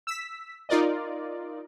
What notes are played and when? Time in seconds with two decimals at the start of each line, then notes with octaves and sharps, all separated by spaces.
0.07 E6 B6
0.69 D#4 F4 A#4 D5 D#5